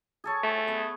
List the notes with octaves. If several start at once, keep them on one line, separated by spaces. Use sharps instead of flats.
G#4 A4 C#5
A3
B3